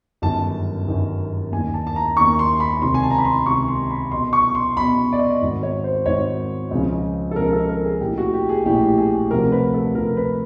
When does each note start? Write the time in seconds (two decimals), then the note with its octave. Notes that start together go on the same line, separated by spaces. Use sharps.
0.22 G1 F#2 D#3 A5
0.87 G1 F#2 D#3
1.52 D#2 G#5
1.57 D#3
1.74 A5
1.87 A5
1.96 A#5
2.17 D#2 D#3 C#6
2.39 C6
2.60 B5
2.82 C#2 C3 D#3 C6
2.94 G#5
3.03 A5
3.10 A#5
3.18 B5
3.25 C6
3.46 C#2 C3 D#3 C#6
3.68 C6
3.91 B5
4.12 B1 B2 C6
4.33 C#6
4.55 C6
4.76 B1 B5
4.81 B2
5.13 D5
5.19 D#5
5.41 G#1 G#2 D#3
5.63 C#5
5.84 C5
6.06 G#1 G#2 D#3 C#5
6.71 C#2 C#3 F3
7.31 A4
7.36 C#2 C#3 F3 A#4
7.53 A4
7.69 A#4
7.85 G#4
8.00 A#1 A2 E3 G4
8.18 F#4
8.33 G4
8.49 G#4
8.65 A#1 A2 E3 G4
8.98 G#4
9.31 D2 C3 F3 A#4
9.52 B4
9.74 A4
9.95 D2 C3 F3 A#4
10.17 B4